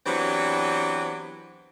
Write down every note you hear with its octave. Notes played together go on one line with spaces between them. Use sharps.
E3 F#3 B3 C4 D4 G4